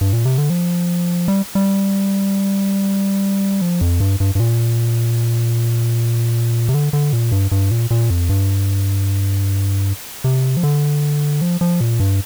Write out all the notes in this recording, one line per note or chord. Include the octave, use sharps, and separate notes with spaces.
G2
A#2
C3
D3
F3
G3
G3
F3
F2
G2
G2
G2
A#2
C3
D3
D3
A#2
G2
G2
A#2
A#2
F2
G2
C3
F3
D3
F3
F3
A#2
G2